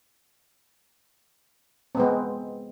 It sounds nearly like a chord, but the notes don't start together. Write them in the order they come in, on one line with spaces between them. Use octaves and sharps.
C4 B3 G#3